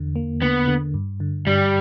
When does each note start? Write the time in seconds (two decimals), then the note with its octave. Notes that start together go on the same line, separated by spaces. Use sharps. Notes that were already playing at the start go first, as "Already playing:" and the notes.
Already playing: E2 D3
0.16 A#3
0.42 D3 B3
0.68 D3
0.94 G2
1.20 D3
1.47 G2 G3